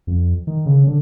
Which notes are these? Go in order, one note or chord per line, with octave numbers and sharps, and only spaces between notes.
F2
D#3
C#3
D3